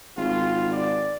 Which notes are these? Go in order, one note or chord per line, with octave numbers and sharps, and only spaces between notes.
G#1 F4
D5